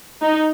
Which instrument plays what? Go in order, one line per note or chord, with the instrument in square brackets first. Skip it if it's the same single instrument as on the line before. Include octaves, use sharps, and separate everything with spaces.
[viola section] D#4